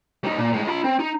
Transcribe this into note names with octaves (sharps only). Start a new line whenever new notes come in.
G3 D#4
A#2
A2 G#3
F4 B5
C4
D#4